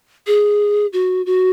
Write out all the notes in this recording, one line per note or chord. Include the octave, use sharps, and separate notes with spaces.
G#4
F#4
F#4